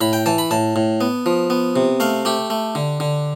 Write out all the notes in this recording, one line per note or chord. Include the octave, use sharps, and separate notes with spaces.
A2 B5
G5
E3 A5
B5
A2 A5
A2
B3
F3
B3
C3
A3 F5
A3 G4
A3
D3
D3